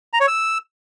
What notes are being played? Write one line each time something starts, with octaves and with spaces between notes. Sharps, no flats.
A#5
C#5
E6